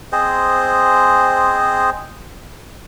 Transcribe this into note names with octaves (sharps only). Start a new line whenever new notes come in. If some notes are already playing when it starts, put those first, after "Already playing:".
C4 G#4 C5 D#5